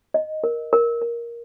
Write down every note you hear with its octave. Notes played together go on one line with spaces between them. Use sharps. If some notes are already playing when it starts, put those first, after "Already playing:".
D#5
A#4
A#4
A#4